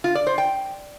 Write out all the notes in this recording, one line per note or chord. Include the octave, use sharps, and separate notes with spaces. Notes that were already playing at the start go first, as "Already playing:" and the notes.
F4
D5
C5
G5